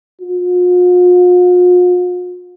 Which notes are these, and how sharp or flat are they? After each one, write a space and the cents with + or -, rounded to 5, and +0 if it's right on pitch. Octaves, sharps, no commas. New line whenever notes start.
F4 +45